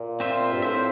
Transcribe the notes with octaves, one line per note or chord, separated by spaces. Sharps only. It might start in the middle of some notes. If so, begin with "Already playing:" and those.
Already playing: A#2
C4 F4 C5 E5
G2
A2 C4 F4 C5 E5